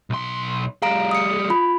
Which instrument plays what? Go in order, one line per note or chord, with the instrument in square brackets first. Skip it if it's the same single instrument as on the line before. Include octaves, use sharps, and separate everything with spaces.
[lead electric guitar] B1 C6
[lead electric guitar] G3 G#4 [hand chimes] F5 A#5 D7
[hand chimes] D#6 C#7
F4 B5